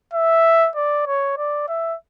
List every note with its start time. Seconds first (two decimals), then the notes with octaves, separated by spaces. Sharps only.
0.14 E5
0.76 D5
1.07 C#5
1.38 D5
1.68 E5